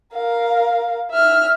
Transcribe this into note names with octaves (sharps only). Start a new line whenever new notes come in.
A#4 F5
E5 F6